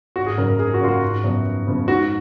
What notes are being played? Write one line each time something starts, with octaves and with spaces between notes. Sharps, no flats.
G#1 F#4
G#4
F#2 C#3 F#3 A#3 A#4
A#4
G#1 G#4
F#4
F#2 C#3 F#3 A#3 F4
F#4
G#1
F#2 C#3 F3 B3
G#1
F#2 C#3 F3 B3
G#2 F#4